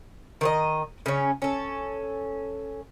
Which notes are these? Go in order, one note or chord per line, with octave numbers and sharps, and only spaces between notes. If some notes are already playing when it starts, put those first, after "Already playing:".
D#3 C5 D#5
C#3 C#4
C#4 A4